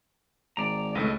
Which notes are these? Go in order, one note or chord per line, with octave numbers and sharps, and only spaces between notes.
G#1 D5 A#5
C#2 A2 A3 A4 B4 D#5